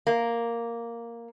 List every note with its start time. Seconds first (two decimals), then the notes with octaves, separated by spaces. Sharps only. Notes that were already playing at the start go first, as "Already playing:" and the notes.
0.07 A#3